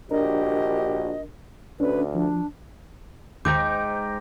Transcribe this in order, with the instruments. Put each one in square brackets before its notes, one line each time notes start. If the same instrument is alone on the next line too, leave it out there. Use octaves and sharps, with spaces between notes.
[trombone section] A#1 F#4 G4 [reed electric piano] D4 A#4 [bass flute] D#5
[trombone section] D2 [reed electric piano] C#4 D4 [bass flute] B4
[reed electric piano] F3 [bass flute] D4
[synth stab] G#1 D#2 [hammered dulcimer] G#2 G5 A#5 [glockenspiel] D6 [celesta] G6